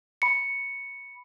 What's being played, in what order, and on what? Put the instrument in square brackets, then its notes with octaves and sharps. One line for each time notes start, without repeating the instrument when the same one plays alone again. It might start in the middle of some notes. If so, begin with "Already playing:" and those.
[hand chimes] B5 C#7